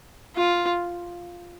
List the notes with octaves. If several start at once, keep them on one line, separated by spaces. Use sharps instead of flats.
F4